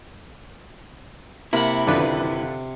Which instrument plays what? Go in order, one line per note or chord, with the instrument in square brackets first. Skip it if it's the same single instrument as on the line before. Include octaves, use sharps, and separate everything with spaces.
[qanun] C3 F#5 B5 [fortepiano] A#3 [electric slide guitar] E4
[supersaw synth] F#2 D#3 B4 [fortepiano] D3 F4 D5